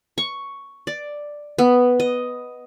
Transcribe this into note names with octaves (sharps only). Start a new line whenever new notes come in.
C#6
D5
B3
D#5